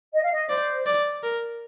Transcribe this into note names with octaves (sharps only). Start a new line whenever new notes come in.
D#5
F5
D#5
C5 D5
D5
A#4